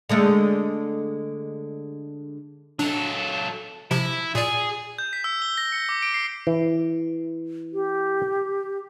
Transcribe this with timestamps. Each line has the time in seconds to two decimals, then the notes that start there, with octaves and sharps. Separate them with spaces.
0.09 D3 G#3 A3
2.79 F#3 D4 A4
3.91 C3 F3 E4
4.35 A#2 G#4 D5
4.98 G6
5.13 B6
5.24 E6
5.42 G7
5.58 A#6
5.72 C#7
5.89 D6
6.02 D7
6.14 C7
6.47 E3
7.73 G4